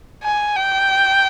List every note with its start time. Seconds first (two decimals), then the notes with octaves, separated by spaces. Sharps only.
0.23 G#5
0.56 G5